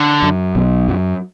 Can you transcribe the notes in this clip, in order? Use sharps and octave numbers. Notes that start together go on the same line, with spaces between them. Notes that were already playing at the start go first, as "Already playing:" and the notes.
Already playing: D3
F#2
B1 B2
F#2